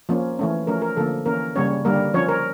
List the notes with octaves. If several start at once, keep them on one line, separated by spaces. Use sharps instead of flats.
F3 A#3 C#4
E3 A3 C#4
F3 A3 C#4 A#4
A#4
D3 F3 A#3 A4
E3 A#3 C#4 A#4
C#3 G3 A#3 C#4 C#5
D3 G3 A#3 A#4
F3 C#4 C#5
A#4